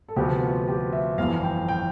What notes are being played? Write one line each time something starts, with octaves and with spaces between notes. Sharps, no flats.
A4
D2 C3 F3 B3 G4
F4
G4
E5
G1 F2 E3 F5
F5
G5
G5